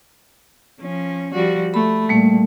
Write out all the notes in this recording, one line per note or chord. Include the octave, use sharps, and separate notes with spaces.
F3 C#4
F3 G3 F#4
A3 B5
A#2 G3 A3